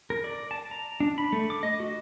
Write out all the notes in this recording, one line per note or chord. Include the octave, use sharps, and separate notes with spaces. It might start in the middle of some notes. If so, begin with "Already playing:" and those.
A#4
D5
A5
A#5
D4
B5
A3
D6
D#5
F#4